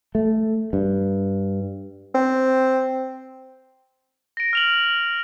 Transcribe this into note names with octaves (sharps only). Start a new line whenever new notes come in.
A3
G2
C4
A#6 D7
F6 F7 F#7